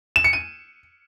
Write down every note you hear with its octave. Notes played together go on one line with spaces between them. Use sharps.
E7
C#7
D#7